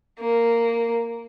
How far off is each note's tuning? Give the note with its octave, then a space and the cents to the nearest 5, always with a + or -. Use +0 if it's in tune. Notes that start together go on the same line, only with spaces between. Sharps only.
A#3 -10